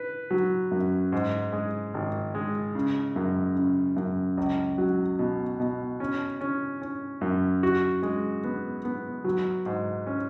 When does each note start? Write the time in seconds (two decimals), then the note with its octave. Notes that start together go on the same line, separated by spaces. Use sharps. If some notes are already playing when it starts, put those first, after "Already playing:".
Already playing: B4
0.31 F#3
0.71 F#2
1.12 G#2
1.52 G#3
1.94 G#1
2.35 G#3
2.75 C#3
3.16 F#2
3.56 C#3
3.96 F#2
4.37 C#2
4.78 F#3
5.19 B2
5.60 B2
6.00 C#4
6.41 C#4
6.82 C#4
7.21 F#2
7.63 F#4
8.03 G#3
8.44 B3
8.85 B3
9.25 F#3
9.66 G#2
10.07 C#4